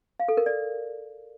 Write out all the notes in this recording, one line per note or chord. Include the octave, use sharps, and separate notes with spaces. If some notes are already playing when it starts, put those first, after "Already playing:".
F5
A4
A#4
D5